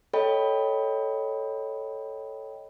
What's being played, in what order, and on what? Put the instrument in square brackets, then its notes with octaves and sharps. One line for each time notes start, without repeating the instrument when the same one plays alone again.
[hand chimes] A4 C#5 D#5 G5 B5